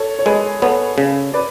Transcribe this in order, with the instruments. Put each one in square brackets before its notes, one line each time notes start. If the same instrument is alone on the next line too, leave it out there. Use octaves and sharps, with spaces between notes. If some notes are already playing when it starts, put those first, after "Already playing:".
Already playing: [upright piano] A4 C#5
C#5
[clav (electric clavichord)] G#3 [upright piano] G#4 B4
[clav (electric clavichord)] B3 [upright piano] A4 C#5
[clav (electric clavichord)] C#3
[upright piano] B4 D5